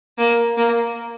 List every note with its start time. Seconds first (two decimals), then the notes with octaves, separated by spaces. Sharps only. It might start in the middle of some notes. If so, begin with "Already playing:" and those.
0.18 A#3
0.57 A#3